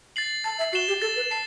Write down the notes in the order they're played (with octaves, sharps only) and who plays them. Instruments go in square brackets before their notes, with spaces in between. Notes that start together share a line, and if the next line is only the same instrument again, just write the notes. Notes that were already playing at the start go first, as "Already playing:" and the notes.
[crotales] A6 C7 F#7
[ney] A5 [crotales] A6
[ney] E5
[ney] F#4 [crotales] C7 E7 G7
[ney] G4
[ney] A4 [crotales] A6
[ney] B4
[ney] A5 [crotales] C7